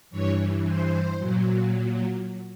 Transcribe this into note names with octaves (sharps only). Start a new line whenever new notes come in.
G2 E3 C#5
C5
A#2 F#3